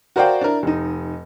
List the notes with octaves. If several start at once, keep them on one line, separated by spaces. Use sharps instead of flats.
F#4 A#4 C5 D5 F5 G5
D4 E4 A#4
F1 D#4